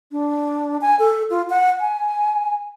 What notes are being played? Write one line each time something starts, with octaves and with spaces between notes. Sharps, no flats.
D4
G#5
A4
F4
F#5
G#5